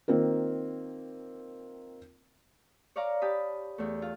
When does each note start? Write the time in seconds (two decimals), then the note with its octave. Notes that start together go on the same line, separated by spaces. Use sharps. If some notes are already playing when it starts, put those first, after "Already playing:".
0.08 D#3 A#3 C4 F4 A#4
2.96 C#5 D5 F5 A#5 C#6
3.21 G4 A5 B5 D#6
3.78 E2 A3
4.02 F4